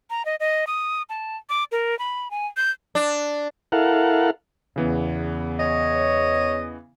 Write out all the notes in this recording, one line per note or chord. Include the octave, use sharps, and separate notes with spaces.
A#5
D#5
D#5
D#6
A5
D6
A#4
B5
G#5
G6
D4
E4 A4 A#4 F5 F#5
E2 C#3 E3 B3
C#5 D#5